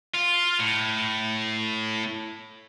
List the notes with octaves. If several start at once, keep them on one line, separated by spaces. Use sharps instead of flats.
F4
A2